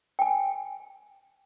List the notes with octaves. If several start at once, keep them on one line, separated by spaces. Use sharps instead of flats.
G5 G#5